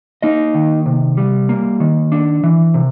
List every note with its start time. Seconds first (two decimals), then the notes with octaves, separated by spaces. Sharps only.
0.22 A#3 D#4 D#5
0.55 D#3
0.86 C3
1.17 G3
1.49 A#3
1.80 D#3
2.12 D4
2.43 E3
2.74 C3